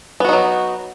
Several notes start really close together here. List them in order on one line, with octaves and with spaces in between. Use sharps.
B3 F#4 D#4 F#3